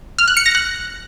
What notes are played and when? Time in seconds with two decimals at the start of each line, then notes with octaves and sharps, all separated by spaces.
0.19 F6
0.28 F#6
0.37 C#7
0.46 A#6
0.55 F#6